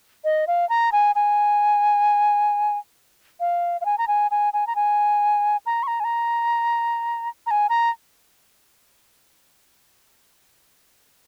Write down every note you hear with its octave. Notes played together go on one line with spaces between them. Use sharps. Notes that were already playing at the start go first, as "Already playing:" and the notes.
D#5
F5
A#5
G#5
G#5
F5
F5
G#5
A#5
G#5
G#5
G#5
A#5
G#5
A#5
C#6
A#5
G#5
A#5
A#5
G#5
A#5